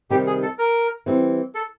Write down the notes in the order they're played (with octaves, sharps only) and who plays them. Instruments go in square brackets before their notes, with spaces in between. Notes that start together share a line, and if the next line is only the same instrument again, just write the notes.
[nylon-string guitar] C3 D#3 G3 [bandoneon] G4
[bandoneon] G#4
A4
A#4
[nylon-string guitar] E3 G3 C4
[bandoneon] A4